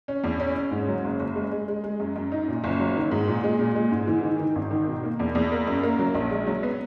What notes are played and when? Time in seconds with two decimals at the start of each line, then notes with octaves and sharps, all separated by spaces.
0.08 C#4
0.24 E2
0.40 C#4
0.55 C#4
0.71 G#2
0.88 F#3
1.04 F#1
1.20 F#1
1.36 G#3
1.52 G#3
1.68 G#3
1.84 G#3
2.00 F#2
2.16 F#2
2.32 D#4
2.48 A#2
2.64 F#1
2.80 F#3
2.96 D#3
3.11 G#2
3.27 A#2
3.44 G#3
3.59 A#2
3.75 G#3
3.91 G#2
4.07 E3
4.23 D#3
4.39 D#3
4.55 G#1
4.71 D#3
4.87 B2
5.04 A#3
5.19 E2
5.35 E2
5.52 A#3
5.67 F#2
5.83 A#3
5.99 F#3
6.15 A#1
6.31 G#3
6.47 F#3
6.63 B3